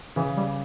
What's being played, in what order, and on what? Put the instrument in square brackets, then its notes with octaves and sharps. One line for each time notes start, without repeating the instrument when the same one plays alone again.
[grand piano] C#3 [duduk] E3
[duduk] G3